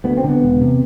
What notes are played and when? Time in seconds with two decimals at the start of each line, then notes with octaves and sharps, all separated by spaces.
0.04 D2 B3
0.17 C4
0.24 D3
0.29 B3
0.42 E1
0.62 C3